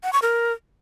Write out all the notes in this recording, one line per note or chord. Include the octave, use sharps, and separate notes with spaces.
F#5
C#6
A#4